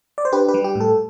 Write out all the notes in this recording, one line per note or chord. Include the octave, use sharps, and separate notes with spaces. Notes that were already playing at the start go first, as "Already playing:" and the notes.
D5
C5
D4 G4 B4
G4 B4
G3
G4
A2
A4